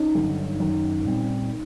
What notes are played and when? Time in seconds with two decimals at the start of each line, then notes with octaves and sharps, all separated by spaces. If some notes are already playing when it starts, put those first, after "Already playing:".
Already playing: C#4 D#4
0.15 G2 D3 F#3
0.60 F#2 D#3 F#3
1.05 A#2 G3 C4